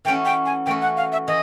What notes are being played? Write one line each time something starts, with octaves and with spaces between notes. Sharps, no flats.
E3 A3 C#4 F#4 G5
G5
G#5
E3 A3 C#4 F#4 G5
F#5
F5
E5
E3 D#5